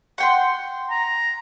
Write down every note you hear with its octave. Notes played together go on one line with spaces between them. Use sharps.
F#5 G5 C6
A#5